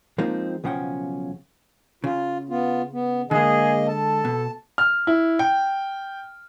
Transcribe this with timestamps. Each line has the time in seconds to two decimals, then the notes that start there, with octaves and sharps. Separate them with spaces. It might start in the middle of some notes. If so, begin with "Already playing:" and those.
0.18 F3 G#3 A#3 C4 D#4 F4
0.64 B1 C#3 F3 C#4 F#5 G5
2.04 C#3 F4
2.49 B3 F4
2.93 B3
3.31 D3 G#3 A#3 G#4 D#5
3.88 A4 A5
4.25 B2
4.78 F6
5.07 E4
5.39 G5